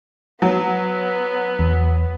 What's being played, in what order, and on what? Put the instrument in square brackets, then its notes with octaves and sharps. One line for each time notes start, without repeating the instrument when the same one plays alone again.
[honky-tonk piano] F#3 [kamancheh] B3
[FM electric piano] E2